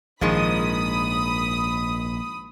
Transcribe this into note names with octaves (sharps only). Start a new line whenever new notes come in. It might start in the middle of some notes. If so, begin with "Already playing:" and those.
A#1 G#2 D#3 F3 G#3 B5 D#6